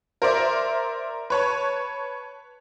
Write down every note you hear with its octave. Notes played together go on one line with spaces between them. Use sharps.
A#4 C5 D5 E5
B4 C#5 A5